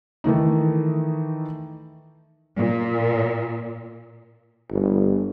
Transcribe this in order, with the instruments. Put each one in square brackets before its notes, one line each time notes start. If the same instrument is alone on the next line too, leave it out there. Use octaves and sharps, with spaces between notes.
[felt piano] D#3 E3 A3 D#4
[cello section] A#2
[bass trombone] G1